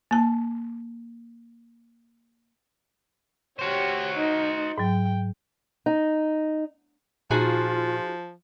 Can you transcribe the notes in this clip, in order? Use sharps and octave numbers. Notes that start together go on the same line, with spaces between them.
A#3 A5
F#4 G4 C5 C#5
D#4
G#2 F#3 G5
D#4
A#2 F3 D#4 F4 F#4 G#4